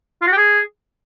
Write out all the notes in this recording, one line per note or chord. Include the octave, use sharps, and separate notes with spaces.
F4
F#4
G4
G#4